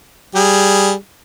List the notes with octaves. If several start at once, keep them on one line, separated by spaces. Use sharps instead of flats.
G3 G#4